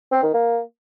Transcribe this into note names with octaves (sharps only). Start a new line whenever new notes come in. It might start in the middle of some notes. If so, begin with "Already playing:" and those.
C4
D#3
A#3